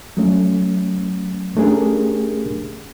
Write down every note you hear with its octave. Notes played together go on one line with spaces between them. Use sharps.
F#3 A3 C#4
A3 C#4 D4 G4 G#4 A#4